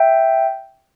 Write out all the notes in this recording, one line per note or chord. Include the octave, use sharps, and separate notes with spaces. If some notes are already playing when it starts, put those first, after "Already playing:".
Already playing: E5 G5